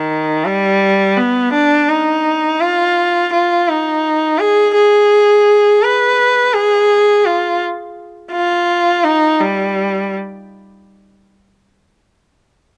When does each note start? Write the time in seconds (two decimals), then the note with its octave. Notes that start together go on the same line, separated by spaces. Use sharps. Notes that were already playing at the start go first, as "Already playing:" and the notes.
Already playing: D#3
0.45 G3
1.17 B3
1.52 D4
1.89 D#4
2.60 F4
3.33 F4
3.68 D#4
4.39 G#4
4.75 G#4
5.82 B4
6.53 G#4
7.25 F4
8.32 F4
9.04 D#4
9.40 G3